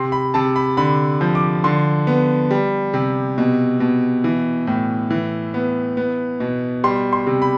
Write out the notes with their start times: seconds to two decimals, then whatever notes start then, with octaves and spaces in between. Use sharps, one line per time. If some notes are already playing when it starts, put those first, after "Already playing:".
Already playing: C3 C6
0.12 B5
0.34 C3 A5
0.56 B5
0.77 D3 B5
1.21 F3
1.35 D6
1.64 D3 C6
2.07 B3
2.51 G3
2.94 C3
3.38 B2
3.80 B2
4.24 E3
4.67 A2
5.11 E3
5.54 B3
5.97 B3
6.40 B2
6.84 G3 C6
7.13 C6
7.26 C3
7.42 B5